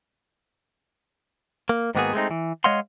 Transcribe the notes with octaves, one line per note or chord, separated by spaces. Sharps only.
A#3
G#2 D#3 A#3 B3 F#4 G#4
G#3 A3 C4 D#4
E3
G#3 C#5 D#5 F5 F#5 C6